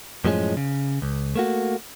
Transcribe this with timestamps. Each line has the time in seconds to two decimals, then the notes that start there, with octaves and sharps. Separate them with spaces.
0.25 F#2 A2 F3 G#3 C#4
0.57 C#3
1.02 C#2
1.36 A3 A#3 F#4